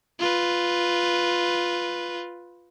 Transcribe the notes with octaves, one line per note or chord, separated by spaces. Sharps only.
F4 B4